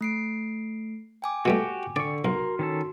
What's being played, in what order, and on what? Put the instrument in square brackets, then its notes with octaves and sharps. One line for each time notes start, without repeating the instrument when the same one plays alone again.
[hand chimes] A3 C7 D7
G5 G#5 D6
[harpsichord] B2 G3 A3 [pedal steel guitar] F#4 G4
[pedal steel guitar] D3 C#6 [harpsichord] D5
[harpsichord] B1 [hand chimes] F#4 C6 [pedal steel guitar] A#4
[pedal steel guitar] D#3 C#4 A4